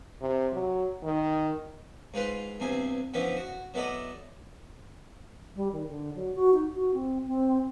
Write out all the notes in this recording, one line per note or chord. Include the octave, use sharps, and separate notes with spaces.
C3
F#3
D#3
G#2 F4 B4 C6
E2 G2 C3 G#5
D3 E3 F3 B3 C#4 E4
F#4
F#3 B3 E4 A4 D5 D#5
G3
D#3
D3
F#3
F#4
D#4
F#4
C4
C4